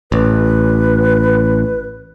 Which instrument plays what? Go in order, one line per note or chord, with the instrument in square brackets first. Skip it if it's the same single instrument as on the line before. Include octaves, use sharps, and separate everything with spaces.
[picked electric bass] A1 [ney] B4